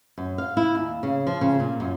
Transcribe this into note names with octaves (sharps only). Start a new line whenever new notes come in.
F#2
F5
E4
D#2
C#3
F3
C#3
A#2
F#2